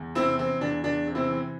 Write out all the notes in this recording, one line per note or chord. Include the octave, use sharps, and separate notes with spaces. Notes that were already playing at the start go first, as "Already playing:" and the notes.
Already playing: E2
C3 C4 E4
E3 C4
E2 D4
E2 D4
C3
C4 E4
E3